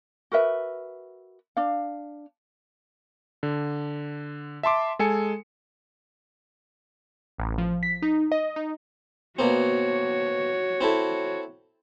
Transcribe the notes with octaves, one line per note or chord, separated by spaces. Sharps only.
F#4 A#4 B4 E5
D4 F5
D3
E5 A5 C6 D6
G#3 A4 G#5 C#7
A1
F3
B6
D#4
D#5
D#4
B2 A#3 C4 F#4 C#5
C4 E4 A4